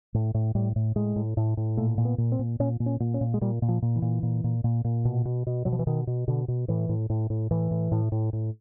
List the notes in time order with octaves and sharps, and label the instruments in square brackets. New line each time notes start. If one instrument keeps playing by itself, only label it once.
[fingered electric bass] A2
A2
A2 G3
A2
A2 G#3
A2
A2
A2
A#2 A3
A#2
B3
A#2
C4
A#2
A#2 C#4
A#2
C#4
A#2
C#4
A#2
G#3
A#2 G3
A#2
F3
A#2
E3
A#2
A#2
A#2
A#2
A#2
B2
B2
B2
B2 F#3
F3
E3
B2 D#3
B2
B2 D3
B2
A2 E3
A2
A2
A2
A2 E3
A2
A2
A2
A2